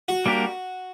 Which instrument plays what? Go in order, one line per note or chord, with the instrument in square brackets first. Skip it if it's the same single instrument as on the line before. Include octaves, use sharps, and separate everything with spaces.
[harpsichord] F#4
[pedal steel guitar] G3 A#3 D4 G4 A#4